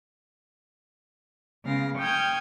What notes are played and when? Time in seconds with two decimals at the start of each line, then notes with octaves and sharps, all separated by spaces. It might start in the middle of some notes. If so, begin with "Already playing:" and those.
1.66 C#3 G#3 B3 F5 A#6
1.97 G5 C#6 D#6 F6 G6 G#6